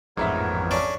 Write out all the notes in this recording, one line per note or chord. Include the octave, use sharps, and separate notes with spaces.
A1 F2 G#2 B3 A#4 C#5 E5
C#4 D4